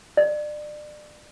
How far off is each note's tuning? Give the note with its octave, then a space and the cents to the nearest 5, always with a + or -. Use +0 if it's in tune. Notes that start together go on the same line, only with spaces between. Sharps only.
D5 +30